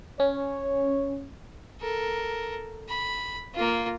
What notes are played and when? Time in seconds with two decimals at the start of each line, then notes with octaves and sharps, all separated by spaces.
0.20 C#4 C#5
1.81 A4 A#4
2.89 B5
3.54 A#3 F4